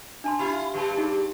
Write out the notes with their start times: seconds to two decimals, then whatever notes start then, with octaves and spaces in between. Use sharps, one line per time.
0.24 D4 A5 C6
0.39 D4 E4 F4 G4 B5
0.74 G2 G3 G4 A5
0.97 D#4 F#4 G#4